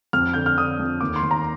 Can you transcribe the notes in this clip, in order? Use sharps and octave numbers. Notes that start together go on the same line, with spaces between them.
F2 F6
D3 G6
F6
D3 D#6
F2
D#2 D6
C6
D#2
A#5